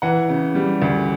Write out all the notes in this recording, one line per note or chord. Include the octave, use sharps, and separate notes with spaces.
E3 F#5
C#3
G3
D2